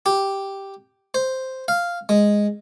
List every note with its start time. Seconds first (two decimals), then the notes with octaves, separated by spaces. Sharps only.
0.06 G4
1.14 C5
1.68 F5
2.09 G#3